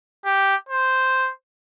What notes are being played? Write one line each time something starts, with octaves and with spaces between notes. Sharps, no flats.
G4
C5